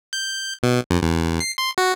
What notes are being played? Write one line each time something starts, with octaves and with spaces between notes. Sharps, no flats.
G6
B2
F2
E2
C7
C6
F#4